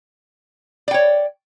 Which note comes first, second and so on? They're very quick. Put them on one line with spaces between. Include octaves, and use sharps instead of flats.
D5 G5 C#5